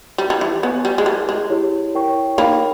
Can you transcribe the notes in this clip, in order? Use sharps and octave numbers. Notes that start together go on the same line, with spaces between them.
G3 E4 G4 C#5
G3
E3
B3 C#5 G#5 C#6
G3
G#3
G3 E4 A#4 E5
G#3
E4 G4 C#5
E4 A#4 C#5 G5 C#6
A#3 D#4 A#4 C#5 G5 B5